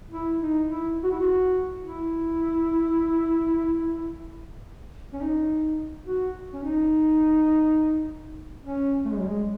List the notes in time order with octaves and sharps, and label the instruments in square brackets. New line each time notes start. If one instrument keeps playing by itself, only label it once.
[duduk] E4
D#4
E4
F#4
E4
F#4
E4
C#4
D#4
F#4
C#4
D#4
C#4
A3
G#3
F#3
G#3